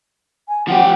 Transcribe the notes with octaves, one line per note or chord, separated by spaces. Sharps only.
G#5
F3 G4 F#5